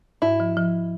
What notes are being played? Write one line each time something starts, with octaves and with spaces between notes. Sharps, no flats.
G#2 E4
F3
F3